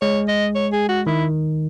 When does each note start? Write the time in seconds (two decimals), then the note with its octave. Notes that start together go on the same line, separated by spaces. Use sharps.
0.02 G#3 C#5
0.28 D#5
0.55 C#5
0.73 G#4
0.89 F#4
1.07 D#3 E4